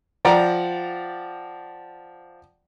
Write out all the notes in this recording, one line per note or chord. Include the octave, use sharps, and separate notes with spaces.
F3 D5 F#5 G5 A#5